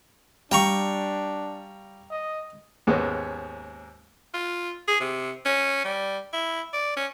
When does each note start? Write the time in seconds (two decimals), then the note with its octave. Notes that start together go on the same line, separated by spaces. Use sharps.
0.52 G3 D4 F5 G5 A#5 C#6
2.11 D#5
2.87 D#2 G#2 G#3 A#3 B3 C#4
4.34 F4
4.88 G#4
5.00 C3
5.45 C#4
5.85 G3
6.33 E4
6.73 D5
6.97 C#4